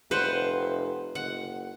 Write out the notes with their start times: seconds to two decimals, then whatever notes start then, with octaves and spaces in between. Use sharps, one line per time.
0.11 F1 B4 C5 F#5
1.15 F#1 F#5